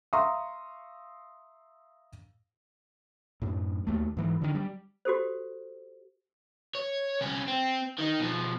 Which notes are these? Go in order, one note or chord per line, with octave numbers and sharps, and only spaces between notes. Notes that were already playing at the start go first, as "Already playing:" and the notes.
E5 F5 A#5 C6 C#6 D#6
F#2 A2
D#2 A3
G#2 E3
D3 D#3
G3
F#4 G4 A4 C5
C#5
C2 C#4
C4
D#3 D#4
B2 F3